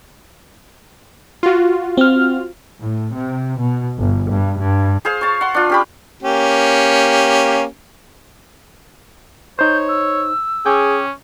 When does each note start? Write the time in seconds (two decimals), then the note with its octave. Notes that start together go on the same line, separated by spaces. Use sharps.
1.43 F4 F#4
1.97 C4 F6
2.81 A2
3.13 C3
3.59 B2
3.98 G1
4.30 G2
4.60 G2
5.05 G#4 C5 F5
5.21 C#5 A5
5.41 F#5 C6
5.54 D4 F4
5.70 C#4 G4 B5
6.23 A#3 C#4 G4
9.59 D#4 C5 C#5 G6
9.89 E6
10.66 C#4 G#4 G5 D6